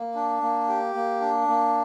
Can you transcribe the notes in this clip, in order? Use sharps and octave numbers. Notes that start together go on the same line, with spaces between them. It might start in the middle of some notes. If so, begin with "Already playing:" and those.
Already playing: A#3
D4
A#3
G4
A#3
D4
A#3